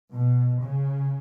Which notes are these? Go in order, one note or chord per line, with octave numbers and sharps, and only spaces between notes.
B2
C#3